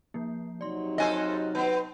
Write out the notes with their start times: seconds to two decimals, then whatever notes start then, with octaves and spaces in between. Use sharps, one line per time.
0.14 F3 A#3
0.61 C3 F#3 D#4 D5 C6
0.98 F2 A4 C5 D#5 G#5 F6 F#6 A#6
1.55 B3 C4 A5